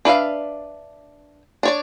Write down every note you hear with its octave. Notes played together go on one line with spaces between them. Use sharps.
D4 B4 E5 F5
D4 C#5 D5